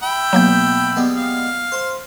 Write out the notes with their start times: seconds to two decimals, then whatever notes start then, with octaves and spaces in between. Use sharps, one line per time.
0.03 E5 G5 B5
0.33 B2 F#3 A#3 G6
0.96 G3 G#3 B3
1.16 F5
1.72 C5 C6